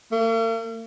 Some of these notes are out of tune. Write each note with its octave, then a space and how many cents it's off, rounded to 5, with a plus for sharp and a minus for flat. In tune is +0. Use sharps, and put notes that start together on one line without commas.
A#3 -45